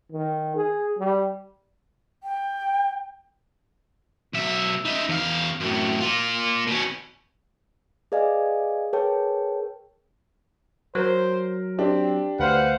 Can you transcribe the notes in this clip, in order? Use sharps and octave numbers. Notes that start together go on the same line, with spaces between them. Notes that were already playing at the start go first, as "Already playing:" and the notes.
D#3
G#4
G3
G5
B1 E5
D#4 E5
E2 F5
F#2 A2
A#3 F4
B2 C#4
G#4 B4 D5 D#5 F5 G#5
G#4 A#4 B4 C#5 G5 A5
F#3 A#4 C5
C4 D4 G4
D2 B4 C5 F5 F#5